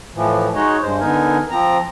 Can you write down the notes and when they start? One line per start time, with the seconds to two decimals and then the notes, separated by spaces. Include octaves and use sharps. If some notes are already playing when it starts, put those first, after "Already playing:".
0.15 A2 E3 F3
0.55 G#3 D#4 F#4 G#4 C#5 D#5
0.82 G2 G#3 C5
1.00 D3 B3 D#4 A#4 G#5
1.50 F3 C4 A#5